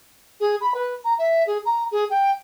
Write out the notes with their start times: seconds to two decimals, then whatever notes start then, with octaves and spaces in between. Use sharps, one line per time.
0.40 G#4
0.61 B5
0.74 B4
1.04 A#5
1.19 E5
1.47 G#4
1.65 A#5
1.92 G#4
2.10 G5